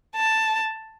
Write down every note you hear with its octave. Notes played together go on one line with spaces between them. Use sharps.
A5